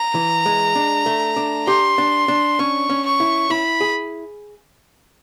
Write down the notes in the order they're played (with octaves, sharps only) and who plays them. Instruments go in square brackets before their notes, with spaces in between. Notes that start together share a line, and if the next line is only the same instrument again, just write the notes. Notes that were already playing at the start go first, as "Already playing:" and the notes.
Already playing: [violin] A#5
[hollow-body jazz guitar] E3
G#3
D4
A3
D4
[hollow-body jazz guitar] G4 [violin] C6
[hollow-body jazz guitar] D4
D4
[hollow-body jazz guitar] C#4 [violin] C#6
[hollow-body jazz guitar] C#4
[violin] C#6
[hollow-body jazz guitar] E4
[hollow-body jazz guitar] E4 [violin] B5
[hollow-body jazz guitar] G#4